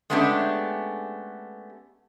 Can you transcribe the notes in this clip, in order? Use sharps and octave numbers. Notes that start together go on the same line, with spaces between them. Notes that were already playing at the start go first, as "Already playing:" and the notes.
G#3 A3 B3 C#4 D4 G4